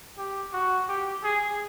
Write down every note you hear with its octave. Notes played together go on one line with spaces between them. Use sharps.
G4
F#4
G4
G#4